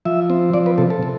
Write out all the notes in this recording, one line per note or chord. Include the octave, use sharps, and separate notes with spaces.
F3 E5
C4
F3 D5
B4
C3 A4
A4
C3